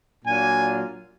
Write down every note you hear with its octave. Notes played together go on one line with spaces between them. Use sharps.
A#2 F#3 A#3 D4 F4 G#5